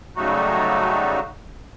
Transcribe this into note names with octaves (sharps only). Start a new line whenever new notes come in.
C#3 F#3 G3 A3 D#4 F#4